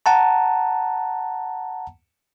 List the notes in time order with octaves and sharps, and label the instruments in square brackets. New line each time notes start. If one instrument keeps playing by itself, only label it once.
[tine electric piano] F#5 A5 A#5